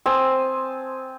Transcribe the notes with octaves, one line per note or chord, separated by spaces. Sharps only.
C4 G#5 A5 D#6